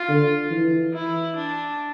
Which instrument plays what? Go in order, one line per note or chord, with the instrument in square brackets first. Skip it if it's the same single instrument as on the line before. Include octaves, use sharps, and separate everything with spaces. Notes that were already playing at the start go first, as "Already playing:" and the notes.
Already playing: [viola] F4
[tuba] D3
E3
[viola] E4
D4